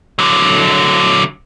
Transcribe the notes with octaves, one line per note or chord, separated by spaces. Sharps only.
D3 F#3